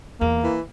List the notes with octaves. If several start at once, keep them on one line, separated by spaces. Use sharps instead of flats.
E2 A#3
E3